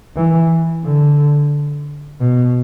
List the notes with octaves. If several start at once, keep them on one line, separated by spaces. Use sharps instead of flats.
E3
D3
B2